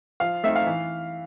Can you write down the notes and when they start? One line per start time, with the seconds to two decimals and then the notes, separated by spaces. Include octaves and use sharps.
0.20 F3 F5
0.43 A3 C4 D#4 E5
0.55 F5
0.67 E3